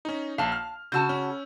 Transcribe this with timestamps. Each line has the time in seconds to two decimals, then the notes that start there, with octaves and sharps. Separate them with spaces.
0.05 C#4 D#4
0.38 A#1 F5 A5
0.52 F6
0.92 C#3 F#4 A5 E6 G6
1.09 C#4